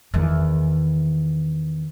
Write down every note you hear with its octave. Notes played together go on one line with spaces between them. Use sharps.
E2 D#3